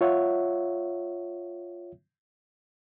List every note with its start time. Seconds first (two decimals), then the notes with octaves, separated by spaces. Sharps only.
0.01 F4 C#5 E5 F#5